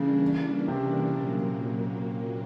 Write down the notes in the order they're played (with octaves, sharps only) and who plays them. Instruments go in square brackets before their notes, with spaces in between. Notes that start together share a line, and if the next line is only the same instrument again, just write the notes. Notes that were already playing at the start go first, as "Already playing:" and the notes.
Already playing: [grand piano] C#3 [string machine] E3 G3 A#3 D4
[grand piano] C3
[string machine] A#2 F#3 A#3